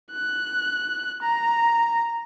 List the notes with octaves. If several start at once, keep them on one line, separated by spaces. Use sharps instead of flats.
F#6
A#5